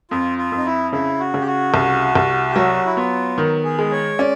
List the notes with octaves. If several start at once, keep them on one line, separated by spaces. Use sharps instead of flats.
F2 F4
F4
F2
D#4
E4
C#3 E4
F#4
C#3
G4
F#4
C2
C2
G4
F#3 F#4
E4
B3 F4
D#3
G#4
G#3
C#5
C#4 D5